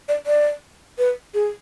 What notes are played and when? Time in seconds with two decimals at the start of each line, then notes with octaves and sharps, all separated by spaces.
0.09 D5
0.26 D5
0.98 B4
1.34 G#4